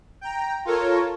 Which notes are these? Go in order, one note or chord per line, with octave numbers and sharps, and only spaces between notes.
G5 A#5
F4 A4 A#4 C#5